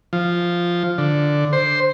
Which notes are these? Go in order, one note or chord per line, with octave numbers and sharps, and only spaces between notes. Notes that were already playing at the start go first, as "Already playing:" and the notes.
F3
D3
C5